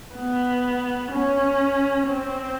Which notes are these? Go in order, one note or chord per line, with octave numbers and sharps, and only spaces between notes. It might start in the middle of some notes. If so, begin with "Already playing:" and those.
B3
C#4
C4